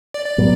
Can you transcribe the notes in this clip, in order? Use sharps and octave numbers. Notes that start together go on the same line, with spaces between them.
D5
D5
A2 F#3 B3